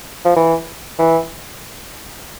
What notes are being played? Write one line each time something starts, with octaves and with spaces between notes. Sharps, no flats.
F3
E3
E3